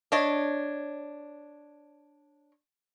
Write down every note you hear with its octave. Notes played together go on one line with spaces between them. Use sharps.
D4 C#5 D#5